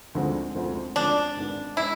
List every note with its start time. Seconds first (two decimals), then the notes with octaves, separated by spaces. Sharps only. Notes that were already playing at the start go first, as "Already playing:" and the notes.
0.15 D2 D3 F3 G#3 C4
0.55 D2 D3 F3 G#3 C4
0.96 D2 D3 F3 G#3 C4 D4
1.36 G#1 G#2 G#3 B3
1.77 G#3 B3 E4